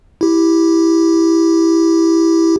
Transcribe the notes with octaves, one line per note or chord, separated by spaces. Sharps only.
E4 G4